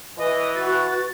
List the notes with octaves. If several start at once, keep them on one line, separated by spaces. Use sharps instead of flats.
E3 B4 D#5
F#4 A6